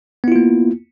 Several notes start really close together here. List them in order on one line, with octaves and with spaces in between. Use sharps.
B3 E4 F4 A#3